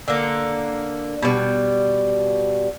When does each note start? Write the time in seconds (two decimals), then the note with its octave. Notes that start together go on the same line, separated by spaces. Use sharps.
0.08 D3 A#3
1.22 B2 G3